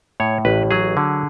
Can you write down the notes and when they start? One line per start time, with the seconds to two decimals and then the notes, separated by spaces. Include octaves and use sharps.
0.20 A2 C#5
0.45 A1 B4
0.71 F#3 G#4
0.97 D3